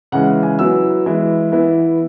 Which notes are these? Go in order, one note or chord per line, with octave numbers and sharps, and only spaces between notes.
C#3 E3 G#3 F#5
G#5
F#3 B3 E4 E6
E3 G#3 E4
E3 B3 E4